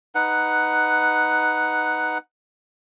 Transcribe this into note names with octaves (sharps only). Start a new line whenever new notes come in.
D#4 B4 F#5